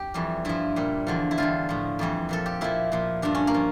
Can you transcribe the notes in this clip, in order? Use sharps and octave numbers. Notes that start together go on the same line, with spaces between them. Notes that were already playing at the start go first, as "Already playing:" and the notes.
Already playing: G4
F2 E3 G3
G2 F3 E4
A#2 G3
E2 D3 F3
E4
E2 D3 G3 F4
A2 F3
F2 E3 G3
A#2 F3 A4
G4
A#2 F3 E4
A#2 F3
G2 F3 D4
C#4
A#3
F3